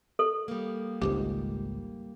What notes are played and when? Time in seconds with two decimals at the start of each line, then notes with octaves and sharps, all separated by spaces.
0.19 A4
0.48 G3 A#3
1.02 G#1 C#2 G#2 G4